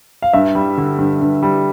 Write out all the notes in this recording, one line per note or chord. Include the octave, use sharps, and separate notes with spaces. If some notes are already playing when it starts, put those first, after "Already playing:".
F5
G2 E5
G3
D3
G2
G2
G3